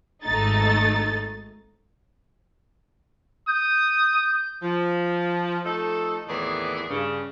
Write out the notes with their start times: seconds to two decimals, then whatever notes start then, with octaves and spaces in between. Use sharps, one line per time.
0.24 G#1 A3 D#4 A6
3.48 D#6 G6
4.63 F3
5.65 F3 A3 D#4 A4
6.27 D#2 A2 E3 B3 G#4 D5
6.89 G2 C#3